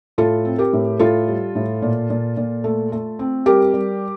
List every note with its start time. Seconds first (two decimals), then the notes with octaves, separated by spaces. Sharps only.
0.18 A2 F4 A4
0.45 C4
0.58 G4 A#4
0.73 A2
0.99 A2 F4 A4
1.28 G3
1.55 A2
1.82 A#2
2.10 A#2
2.37 A#2
2.64 A3
2.92 A3
3.19 C4
3.46 G3 G4 A#4
3.74 G3